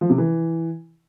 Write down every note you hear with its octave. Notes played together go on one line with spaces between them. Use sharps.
F3
C3
E3